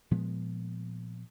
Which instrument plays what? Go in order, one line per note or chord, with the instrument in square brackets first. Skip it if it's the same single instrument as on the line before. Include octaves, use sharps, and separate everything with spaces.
[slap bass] A#2 F3 G#3 B3